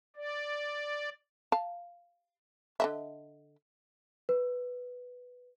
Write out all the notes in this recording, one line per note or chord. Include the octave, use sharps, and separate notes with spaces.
D5
F5 A5
D3 D#5 E5
B4